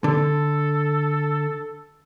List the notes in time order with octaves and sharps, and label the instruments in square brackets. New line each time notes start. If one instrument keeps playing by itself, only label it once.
[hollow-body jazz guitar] D3 [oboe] A4